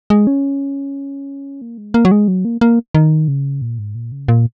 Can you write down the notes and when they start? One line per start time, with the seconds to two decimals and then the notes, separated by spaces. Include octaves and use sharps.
0.10 G#3
0.27 C#4
1.62 A#3
1.78 G#3
1.94 A#3
2.05 F#3
2.12 G#3
2.28 F#3
2.45 A#3
2.61 A#3
2.95 D#3
3.28 C#3
3.62 A#2
3.79 G#2
3.95 A#2
4.12 C#3
4.28 A#2